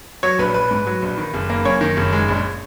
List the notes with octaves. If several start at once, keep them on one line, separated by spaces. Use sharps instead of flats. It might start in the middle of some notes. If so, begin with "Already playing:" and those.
F#3 C#5
A#1 B4
A#1 B4
G#2
F#3
A#1
D#3
F#1
A#3
F#2 C#5
D#3
F#1
G#3
A#1